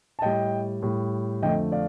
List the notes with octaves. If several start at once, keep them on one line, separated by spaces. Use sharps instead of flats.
A5
A2 G3 D#5 G5
A2 G3
F2 D3 F3 A3 D#5 G5
D5 F5